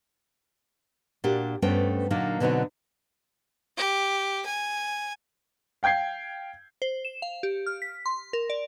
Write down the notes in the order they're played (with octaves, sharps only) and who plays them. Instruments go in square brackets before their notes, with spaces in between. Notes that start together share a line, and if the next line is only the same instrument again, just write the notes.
[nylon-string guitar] A#2 D4 F#4 G4
G2 A3 B3 C#4 C5 G5
A#2 D3 F#3 A#3 D4 D#4
B2 D3 F#3 C4 D#4 F#4
[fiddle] G4
G#5
[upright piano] F5 G5 G6 G#6 C7
[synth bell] C5
E7
F5
G4
F6
B6
C6
A#4
D5